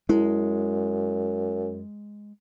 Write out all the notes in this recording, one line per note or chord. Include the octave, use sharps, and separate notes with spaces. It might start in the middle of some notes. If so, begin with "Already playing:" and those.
F#2 G#3 E4